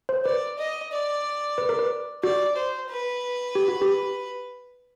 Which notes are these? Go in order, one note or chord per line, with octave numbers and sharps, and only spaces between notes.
C5
B4 D5
D#5
D5
B4
A#4
B4
F#4 D5
C5
B4
G4
F#4
G4